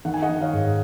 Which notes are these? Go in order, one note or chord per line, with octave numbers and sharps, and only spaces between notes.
D#3 F#5
G#5
D#5 F#5
D#3
C#5 F5
G#2